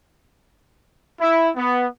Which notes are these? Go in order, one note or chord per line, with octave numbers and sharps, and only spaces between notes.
E4
B3